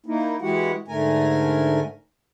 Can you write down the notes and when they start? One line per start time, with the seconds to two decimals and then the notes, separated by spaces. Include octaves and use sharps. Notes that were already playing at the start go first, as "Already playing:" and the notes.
0.06 A#3 D#4 E4
0.42 E3 G#3 E4 F#4 G4 F#5
0.88 G#2 D3 A3 A#4 G#5